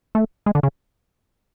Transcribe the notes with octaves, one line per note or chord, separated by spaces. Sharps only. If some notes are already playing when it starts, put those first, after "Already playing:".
A3
G#3
D3
C#3